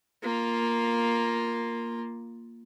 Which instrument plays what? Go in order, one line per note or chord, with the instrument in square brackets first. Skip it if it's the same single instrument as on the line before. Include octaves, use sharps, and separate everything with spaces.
[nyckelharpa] A#3 F4